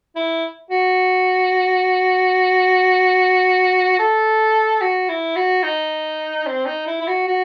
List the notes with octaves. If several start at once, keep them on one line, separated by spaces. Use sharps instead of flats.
E4
F#4
A4
F#4
E4
F#4
D#4
C4
D#4
E4
E4
F#4
F#4